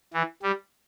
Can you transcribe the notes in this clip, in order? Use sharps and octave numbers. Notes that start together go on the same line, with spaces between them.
E3
G3